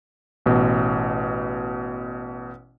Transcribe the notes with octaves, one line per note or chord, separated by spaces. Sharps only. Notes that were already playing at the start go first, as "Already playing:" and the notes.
A1 B2